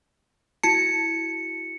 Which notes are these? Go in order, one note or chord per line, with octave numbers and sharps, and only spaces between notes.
E4 F#4 A5 C#7